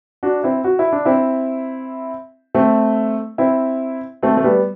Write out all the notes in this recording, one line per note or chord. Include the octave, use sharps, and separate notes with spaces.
D4 F#4
C4 E4
F#4
E4
D4
C4 E4
A3 C4
C4 E4
A3 C4
A3
G3 B3